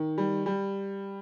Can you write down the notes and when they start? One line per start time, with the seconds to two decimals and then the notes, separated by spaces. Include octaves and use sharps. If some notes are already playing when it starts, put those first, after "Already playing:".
Already playing: D#3
0.18 G3
0.46 G3